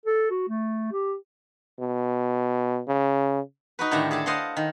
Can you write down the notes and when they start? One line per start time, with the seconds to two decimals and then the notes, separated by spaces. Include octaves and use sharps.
0.06 A4
0.30 F#4
0.49 A3
0.92 G4
1.79 B2
2.88 C#3
3.79 D#4 F#4 B4
3.91 A2 D3 D#3 G4 E5 A#5
4.11 G#4 A4 D5 A5
4.26 C5 D#5 F5 F#5 A5 C6
4.57 D#3